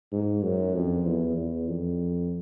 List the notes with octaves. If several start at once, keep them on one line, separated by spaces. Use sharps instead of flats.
G#2
F#2
F2
E2
E2
F2